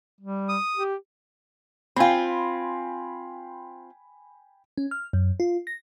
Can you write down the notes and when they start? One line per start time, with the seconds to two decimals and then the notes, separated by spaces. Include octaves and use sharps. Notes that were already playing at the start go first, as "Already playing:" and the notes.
0.21 G3
0.49 D#6
0.76 G4
1.96 C4 F4 G5 G#5 B5
4.78 C#4
4.91 F6
5.13 F#2
5.40 F4
5.67 A#6